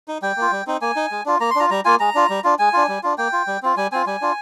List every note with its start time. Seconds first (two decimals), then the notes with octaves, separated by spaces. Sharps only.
0.08 D#4
0.22 G3 G5
0.37 A#3 F4
0.52 G3
0.67 C4 D#4
0.81 A#3 G#5
0.96 D#4
1.11 G#3
1.26 D4 F4
1.40 A#3 A#5
1.51 C6
1.56 D4 F4 A#5
1.71 G3 A#5
1.85 A#3 F4 G#5
2.00 G#3 A#5
2.15 D4 F4
2.30 G3
2.44 D4 F4
2.59 G#3 G#5
2.73 D4 F4
2.89 G3
3.03 D4 F4
3.18 A#3 G5
3.33 F4
3.47 G3
3.63 C4 F4
3.77 G3 G#5
3.92 C4 F4 G#5
4.07 G3 G#5
4.21 D4 F4